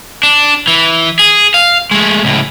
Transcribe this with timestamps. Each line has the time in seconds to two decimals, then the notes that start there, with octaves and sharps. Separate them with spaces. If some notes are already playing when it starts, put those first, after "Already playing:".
0.23 D4
0.68 E3
1.19 G#4
1.54 F5
1.91 G#3 A3
2.24 C#2 A2